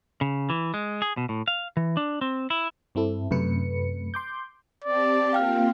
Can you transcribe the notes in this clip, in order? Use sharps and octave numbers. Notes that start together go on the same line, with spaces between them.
C#3
E3
G#3
G#4
B2
A2
F5
E3
D4
C4
E4
G2 C4 E4 A4
F#2 C3 A3 B4 C#7
C6 D6 G6
C4 G4 D5 A5
A#3 C4 F4 F5 G5 F6